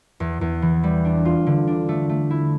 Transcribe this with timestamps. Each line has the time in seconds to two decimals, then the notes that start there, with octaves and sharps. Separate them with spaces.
0.20 E2
0.41 E2
0.62 E3
0.83 G3
1.05 D4
1.25 F4
1.46 D3
1.67 D4
1.89 A3
2.09 A3
2.30 E4